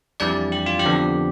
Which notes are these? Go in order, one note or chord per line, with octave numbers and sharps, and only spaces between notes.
F2 E3 G3 D4 D5
G4
F4
G4
F2 D3 F3 B3 D4